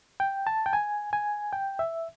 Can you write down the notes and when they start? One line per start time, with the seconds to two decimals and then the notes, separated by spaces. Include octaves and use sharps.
0.20 G5
0.47 A5
0.66 G5
0.73 G#5
1.13 G#5
1.53 G5
1.79 E5